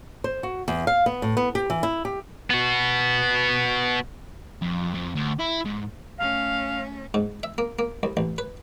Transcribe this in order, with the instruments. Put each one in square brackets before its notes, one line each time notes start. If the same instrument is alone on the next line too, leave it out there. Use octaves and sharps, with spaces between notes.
[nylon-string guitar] C5
F#4
E2
F5
B3
A2
B3
G4
E3
E4
G4
[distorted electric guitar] B3 F#4
F2
F2
D2
E4
G#2
[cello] A3 C#4 [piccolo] F5
[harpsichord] G#2
E5
A#3
A#3
C2
A1
B4